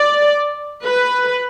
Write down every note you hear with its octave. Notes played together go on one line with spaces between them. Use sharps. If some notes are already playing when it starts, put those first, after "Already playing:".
Already playing: D5
B4